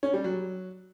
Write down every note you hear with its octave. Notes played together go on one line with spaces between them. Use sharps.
C#4
G3
F#3